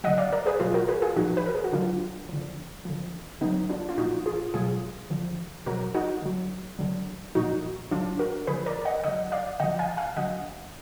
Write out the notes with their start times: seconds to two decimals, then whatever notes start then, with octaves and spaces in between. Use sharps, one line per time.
0.04 D3 F#3 D#5 F#5
0.18 D5 F5
0.32 A#4 D5
0.46 G#4 B4
0.60 B2 F#3 F4 G#4
0.74 F#4 A#4
0.88 G#4 B4
1.02 F4 G#4
1.16 A#2 F3 D#4 F#4
1.37 B4
1.46 A#4
1.55 G#4
1.64 F#4
1.73 D3 F#3 D4 F4
2.29 D3 F3
2.85 D3 F3
3.41 D3 F#3 B3 D#4
3.69 D4 F4
3.89 F4
3.98 A#2 F3 D#4 F#4
4.26 F4 G#4
4.54 B2 F#3 F4 G#4
5.10 D3 F3
5.66 B2 F#3 F#4 A#4
5.94 D#4 F#4
6.22 D3 F#3
6.79 D3 F#3
7.35 A#2 F3 D#4 F#4
7.91 D3 F#3 D4 F4
8.19 F#4 A#4
8.47 D3 F3 G#4 B4
8.66 A#4 D5
8.85 D#5 F#5
9.03 D3 F#3 D#5 F#5
9.32 D5 F5
9.60 D3 F3 D#5 F#5
9.79 F5 G#5
9.97 F5 G#5
10.17 D3 F#3 D#5 F#5